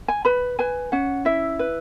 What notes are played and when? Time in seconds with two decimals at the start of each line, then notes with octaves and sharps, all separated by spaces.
0.08 G#5
0.25 B4 B5
0.59 B4 G#5
0.92 C#4 F#5
1.25 E4 E5
1.59 B4